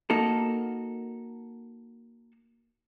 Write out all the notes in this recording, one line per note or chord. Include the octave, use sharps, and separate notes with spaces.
A#3 D#4 F#4 A4